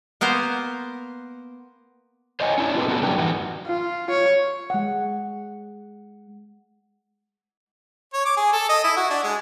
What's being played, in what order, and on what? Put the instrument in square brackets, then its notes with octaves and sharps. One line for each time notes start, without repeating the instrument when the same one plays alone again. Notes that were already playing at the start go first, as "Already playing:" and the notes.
[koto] A#3 B3 A#4 C5
[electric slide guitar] C5 C#5 D#5 F#5 G#5
C#4 D4 E4
C4 F4 G4 G#4 B4
B3 C#4 D4 F#4 A4
F#3 A#3 D4 G4
F#2 E3 D#4 F#4
[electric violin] F4
C#5
[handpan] G#3 F#5
[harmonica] C#5
D6
G#4
A4
D#5
E4
F#4
D4
G#3